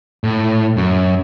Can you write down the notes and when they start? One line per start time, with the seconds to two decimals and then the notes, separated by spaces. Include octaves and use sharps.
0.24 A2
0.77 F#2